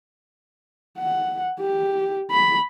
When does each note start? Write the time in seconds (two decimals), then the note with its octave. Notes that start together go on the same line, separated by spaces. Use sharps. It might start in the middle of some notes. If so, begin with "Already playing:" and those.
0.98 F#5
1.60 G4
2.31 B5